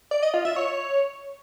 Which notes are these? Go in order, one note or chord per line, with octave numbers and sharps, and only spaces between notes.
D5
D#5
F4
E5
C#5